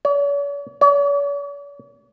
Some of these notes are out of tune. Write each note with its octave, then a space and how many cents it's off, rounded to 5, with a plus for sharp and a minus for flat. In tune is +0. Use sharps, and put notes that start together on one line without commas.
C#5 +45
C#5 +45